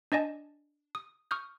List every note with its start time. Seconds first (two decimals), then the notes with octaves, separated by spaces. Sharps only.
0.12 D4 D5 D#5 G#5 A5
0.95 D#6
1.31 C#6 D#6 F6 G6